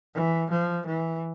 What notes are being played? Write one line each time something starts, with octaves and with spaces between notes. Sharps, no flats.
E3
F3
E3